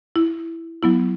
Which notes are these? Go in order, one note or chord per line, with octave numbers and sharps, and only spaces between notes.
E4
F#3 B3 E4